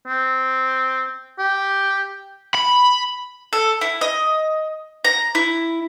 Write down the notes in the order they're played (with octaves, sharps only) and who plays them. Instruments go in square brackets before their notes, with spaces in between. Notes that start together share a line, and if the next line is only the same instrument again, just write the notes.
[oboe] C4
G4
[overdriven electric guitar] B5
[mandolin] A4
E4
D#5
A#5
E4